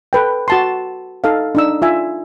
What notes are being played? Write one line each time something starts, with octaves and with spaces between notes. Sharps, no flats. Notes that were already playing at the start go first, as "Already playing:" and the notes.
A4 B4 G5
F#4 A5 C6
D#4 A4 D#5 F5
D4 D#4 E6
F4 E5 G#5